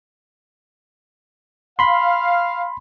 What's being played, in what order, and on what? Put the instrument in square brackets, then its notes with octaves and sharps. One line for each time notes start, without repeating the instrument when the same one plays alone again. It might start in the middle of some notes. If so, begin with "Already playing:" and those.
[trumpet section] F5 [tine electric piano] B5 C6